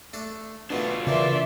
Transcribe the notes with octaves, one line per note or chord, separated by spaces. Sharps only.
A3 D4 A4
B2 D3 A3 D4 F4
C#3 E3 A#3 D5 E5 C6